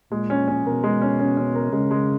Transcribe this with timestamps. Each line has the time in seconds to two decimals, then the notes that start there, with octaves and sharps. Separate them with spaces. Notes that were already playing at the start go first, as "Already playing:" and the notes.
0.11 A#2 G#3
0.30 C#4
0.48 C#4
0.66 B2 A#4
0.84 G#3
1.01 C#4
1.19 C#4
1.37 C#4
1.55 A#4
1.73 C#3 G#3
1.91 G#3